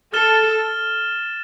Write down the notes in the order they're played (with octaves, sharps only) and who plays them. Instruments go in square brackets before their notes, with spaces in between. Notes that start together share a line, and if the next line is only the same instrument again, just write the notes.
[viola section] A4 [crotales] F6 A6 E7 G7